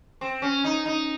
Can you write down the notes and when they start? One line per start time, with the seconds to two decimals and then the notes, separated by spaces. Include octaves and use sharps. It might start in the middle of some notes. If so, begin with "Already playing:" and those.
0.21 C4
0.42 C#4
0.64 D#4
0.86 D#4